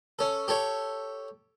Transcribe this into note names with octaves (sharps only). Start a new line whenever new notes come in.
C#4 A4
G4 A4 C#5